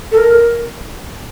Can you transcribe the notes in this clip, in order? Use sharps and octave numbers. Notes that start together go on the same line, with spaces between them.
A4
A#4